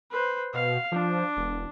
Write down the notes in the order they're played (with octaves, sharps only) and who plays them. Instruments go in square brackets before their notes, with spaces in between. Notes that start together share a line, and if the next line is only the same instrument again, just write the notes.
[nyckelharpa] B4 C5
[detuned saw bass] B2 [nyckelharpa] F5
[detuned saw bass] F3 [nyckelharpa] D4
[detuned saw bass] E1